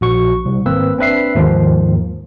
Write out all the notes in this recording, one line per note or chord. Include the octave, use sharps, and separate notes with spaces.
A#1 F#4 C#6
C2
G#1 A#3 C4 B4 E6
C4 D4 B4 E5 C7
D#2 G#2 D#3 F3